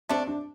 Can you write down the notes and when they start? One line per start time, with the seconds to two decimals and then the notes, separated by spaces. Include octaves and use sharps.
0.09 A3 C4 D4
0.27 D4